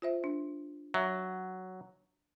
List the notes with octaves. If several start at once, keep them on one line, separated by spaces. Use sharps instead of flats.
F4 C5 E5
D4
F#3 E5